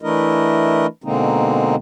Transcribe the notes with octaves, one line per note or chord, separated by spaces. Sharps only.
E3 A3 D4 E4 A#4 D#5
B2 D3 G#3 A#3 C4 D#4